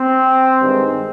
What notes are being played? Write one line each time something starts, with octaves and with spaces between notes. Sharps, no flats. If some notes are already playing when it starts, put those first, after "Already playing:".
Already playing: C4
G2 D#3 G#3